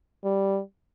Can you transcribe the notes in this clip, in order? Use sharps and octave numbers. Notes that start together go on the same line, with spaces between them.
G3